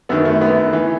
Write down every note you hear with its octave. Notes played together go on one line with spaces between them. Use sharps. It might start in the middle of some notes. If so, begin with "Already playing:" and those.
F#2 D#3 B3
A3
B3
E3